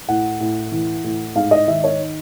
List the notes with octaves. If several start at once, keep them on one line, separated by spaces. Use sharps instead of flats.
A2 F#5
A2
E3
A2
G#2 F5
D#5
D#3 E5
C#5